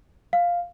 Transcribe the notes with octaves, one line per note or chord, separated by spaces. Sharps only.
F5